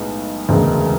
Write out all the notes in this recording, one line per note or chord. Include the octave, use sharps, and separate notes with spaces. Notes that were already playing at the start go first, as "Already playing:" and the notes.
Already playing: B1 A2 G#3 B3
E1 D2 C#3 G#3 B3